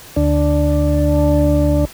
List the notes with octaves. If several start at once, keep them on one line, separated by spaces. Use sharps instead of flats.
D2 D4